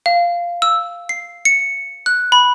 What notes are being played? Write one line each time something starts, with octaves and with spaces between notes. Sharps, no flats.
F5
E6
C7
C#7
F#6
B5